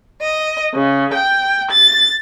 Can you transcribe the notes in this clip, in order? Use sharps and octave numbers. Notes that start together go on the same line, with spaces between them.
D#5
C#3
G5
A6